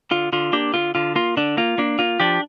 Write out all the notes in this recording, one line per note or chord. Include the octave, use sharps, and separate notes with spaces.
D3 F4
D3 F4
A#3 D4 G4
D3 F4
D3 F4
A#3 F4
D3 D4
A#3 F4
A#3 D4
A#3 F4
F3 D4 G4